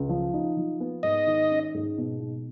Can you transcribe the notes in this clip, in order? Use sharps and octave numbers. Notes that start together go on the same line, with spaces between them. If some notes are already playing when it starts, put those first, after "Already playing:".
Already playing: C#2
F3
D#4
F3
B3
G#2 D#5
D#3
C#4
G#2
B2
B2